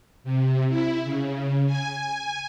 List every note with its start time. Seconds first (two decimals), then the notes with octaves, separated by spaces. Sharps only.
0.24 C3
0.69 E4
1.04 C#3
1.66 G#5